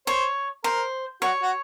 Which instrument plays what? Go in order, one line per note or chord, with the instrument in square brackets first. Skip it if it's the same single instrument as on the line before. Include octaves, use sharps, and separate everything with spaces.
[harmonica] C5 [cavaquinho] C#5
[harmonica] A#4 [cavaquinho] C5
[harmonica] F#4 [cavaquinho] C#5
[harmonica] F#4